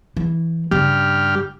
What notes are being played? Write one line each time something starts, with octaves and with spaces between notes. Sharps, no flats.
E3
G2 C#3 C#4 G4 F6